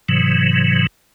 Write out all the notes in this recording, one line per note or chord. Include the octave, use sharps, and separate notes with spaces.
G#2 C3 E3 F#3